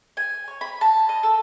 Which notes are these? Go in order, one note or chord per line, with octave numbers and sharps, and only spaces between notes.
G#5
C#5
B5
A5
D#5
A4